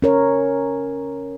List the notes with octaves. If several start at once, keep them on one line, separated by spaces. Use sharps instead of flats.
C#4 A#4 C#5